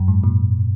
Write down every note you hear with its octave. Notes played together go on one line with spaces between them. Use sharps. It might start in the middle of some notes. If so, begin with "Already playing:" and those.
Already playing: F#2
G#2
A#2